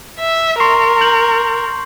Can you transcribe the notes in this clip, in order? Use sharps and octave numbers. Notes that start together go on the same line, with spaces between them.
E5
A#4 C6 C#6 C7
G6 F#7